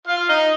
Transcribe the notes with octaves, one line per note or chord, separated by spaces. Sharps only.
F4 F5
D#4 D#5